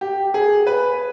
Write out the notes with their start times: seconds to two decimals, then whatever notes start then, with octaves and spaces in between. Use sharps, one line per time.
0.01 G4
0.34 G#4
0.67 B4